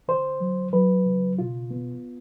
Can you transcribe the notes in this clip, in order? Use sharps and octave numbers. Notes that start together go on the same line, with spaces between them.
D3 C5
F#3
F#3 B4
C#3
B2 F4
B3